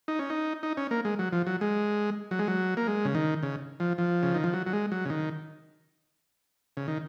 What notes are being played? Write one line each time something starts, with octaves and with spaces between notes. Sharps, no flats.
D#4
C#4
D#4
D#4
C#4
A#3
G#3
F#3
F3
F#3
G#3
F#3
G#3
F#3
A#3
G#3
C#3
D#3
C#3
F3
F3
C#3
D#3
F3
F#3
F#3
G#3
F#3
C#3
D#3
C#3
D#3